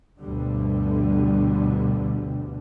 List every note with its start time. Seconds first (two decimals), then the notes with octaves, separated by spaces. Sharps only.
0.18 D2 G2 B2 D3 G3